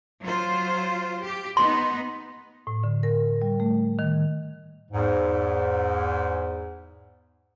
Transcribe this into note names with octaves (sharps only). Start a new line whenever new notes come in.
F#3 F4 C5
G4
B3 D#4 C6
A2
D3
A#4
G3
A3
D#3
E2 G#2